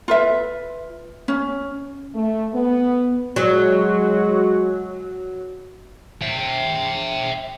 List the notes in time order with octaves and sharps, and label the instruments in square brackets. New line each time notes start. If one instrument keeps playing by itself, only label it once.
[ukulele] F4 B4 E5
C#4
[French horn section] A3
B3
[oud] F#3 [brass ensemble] G#3 F#4
[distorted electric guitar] E5 G5